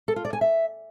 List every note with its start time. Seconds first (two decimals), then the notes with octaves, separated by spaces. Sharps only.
0.08 A4
0.16 F4
0.25 D5
0.33 G#5
0.41 E5